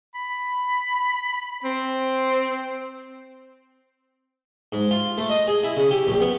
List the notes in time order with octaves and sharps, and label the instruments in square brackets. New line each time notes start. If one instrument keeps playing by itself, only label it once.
[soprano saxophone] B5
C4
[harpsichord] G#2
F4
A3
D#5
G#4
E4
C#3
G4
A#1
B3